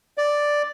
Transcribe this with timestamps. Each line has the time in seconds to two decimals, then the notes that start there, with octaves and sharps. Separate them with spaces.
0.18 D5